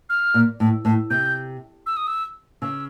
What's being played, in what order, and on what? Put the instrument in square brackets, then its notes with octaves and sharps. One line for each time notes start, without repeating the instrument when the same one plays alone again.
[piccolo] F6
[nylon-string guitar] A#2
A2
A2
[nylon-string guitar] C3 [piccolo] G6
[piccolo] E6
D#6
E6
[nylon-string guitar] C#3 [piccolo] E6